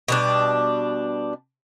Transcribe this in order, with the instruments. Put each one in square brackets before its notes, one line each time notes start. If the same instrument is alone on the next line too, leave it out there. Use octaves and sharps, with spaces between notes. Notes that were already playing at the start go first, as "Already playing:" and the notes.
[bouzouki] B2 G3 D4